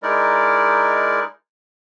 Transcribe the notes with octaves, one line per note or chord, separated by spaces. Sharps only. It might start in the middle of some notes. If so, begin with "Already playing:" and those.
G#3 D#4 E4 A#4 D5